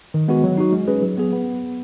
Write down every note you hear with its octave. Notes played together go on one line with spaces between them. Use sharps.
D#3
G#3 B3 F#4
F#3
D#4 F#4
G#3
C#4 G#4 B4
F#3
B3 G#4
B3